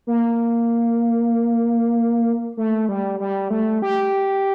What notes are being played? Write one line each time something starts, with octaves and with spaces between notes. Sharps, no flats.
A#3
A3
G3
G3
A3
G4